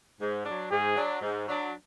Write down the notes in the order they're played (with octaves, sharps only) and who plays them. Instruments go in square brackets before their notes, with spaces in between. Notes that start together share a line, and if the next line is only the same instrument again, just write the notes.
[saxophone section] G#2
F#3 D4
[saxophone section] G#2 [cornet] G#4
[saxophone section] F#3 D4
G#2
F#3 D4